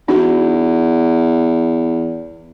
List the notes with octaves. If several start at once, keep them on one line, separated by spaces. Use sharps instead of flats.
E2 D4 D#4 F#4